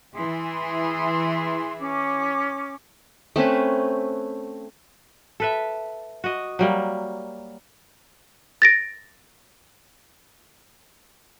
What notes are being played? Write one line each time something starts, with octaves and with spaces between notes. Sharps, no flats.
E3 E4 G#4 C6
C#4 D6
A3 C4 C#4 B4
A4 B4 E5
F#4 D#5
F#3 G3 A#3
A6 A#6 D7